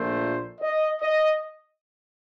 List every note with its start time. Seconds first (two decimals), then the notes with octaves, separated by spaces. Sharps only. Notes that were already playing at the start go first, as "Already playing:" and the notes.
Already playing: A#1 A#2 A3 C5
0.61 D#5
1.01 D#5